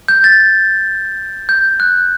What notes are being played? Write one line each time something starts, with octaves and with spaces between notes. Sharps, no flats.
G6
A6
G6
F#6